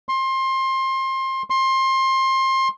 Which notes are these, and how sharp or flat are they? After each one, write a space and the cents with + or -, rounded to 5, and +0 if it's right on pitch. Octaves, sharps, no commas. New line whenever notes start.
C6 +25
C6 +25